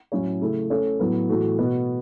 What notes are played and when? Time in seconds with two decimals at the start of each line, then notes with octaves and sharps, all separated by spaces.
0.12 A2 F#3 C#4 E4 C#5
0.41 C#3 A3 E4
0.70 A3 C#4 A4 C#5
0.99 A2 F#3 B3
1.29 A2 E3 A3 F#4
1.58 B2 B3 F#4